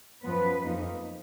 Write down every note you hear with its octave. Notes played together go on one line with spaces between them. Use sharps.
F#2 F3 B3 B4
F2 F3 A#3 D#4